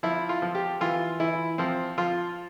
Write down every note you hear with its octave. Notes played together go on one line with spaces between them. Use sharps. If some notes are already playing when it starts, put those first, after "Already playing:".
F3 E4
F4
F3
G4
E3 F4
E3 E4
F3 C4
F3 F4